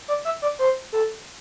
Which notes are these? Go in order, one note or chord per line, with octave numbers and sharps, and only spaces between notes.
D5
E5
D5
C5
A4